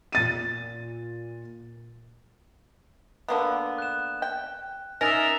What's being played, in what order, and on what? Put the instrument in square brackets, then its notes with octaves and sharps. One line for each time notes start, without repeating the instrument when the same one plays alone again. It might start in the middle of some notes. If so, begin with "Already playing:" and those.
[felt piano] A#2 A6 D#7
[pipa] D3 A#3 B3
[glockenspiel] F#6 E7
[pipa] G5
[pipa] C#4 [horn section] D#4 A#4 E5 [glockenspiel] A6 A#6 F7